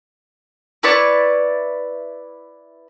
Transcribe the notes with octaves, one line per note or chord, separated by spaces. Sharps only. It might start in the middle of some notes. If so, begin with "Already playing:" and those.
E4 B4 D5 C#6